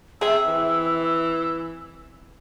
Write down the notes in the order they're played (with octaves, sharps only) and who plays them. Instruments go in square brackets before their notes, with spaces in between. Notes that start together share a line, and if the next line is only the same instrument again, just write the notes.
[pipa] C3 E5 [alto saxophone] G#4 [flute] E6
[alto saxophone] E3